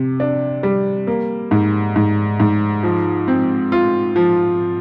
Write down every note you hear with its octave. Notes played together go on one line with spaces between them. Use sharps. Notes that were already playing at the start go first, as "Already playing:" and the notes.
Already playing: C3
D4
G3
A#3
G#2
G#2
G#2
F3
C4
F4
F3